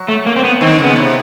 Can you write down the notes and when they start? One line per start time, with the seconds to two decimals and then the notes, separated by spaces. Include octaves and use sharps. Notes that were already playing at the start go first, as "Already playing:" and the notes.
Already playing: F#3
0.08 A3
0.26 A#3
0.36 C4
0.44 B3
0.61 D#3 C4
0.79 C#3
0.84 B3
0.96 C3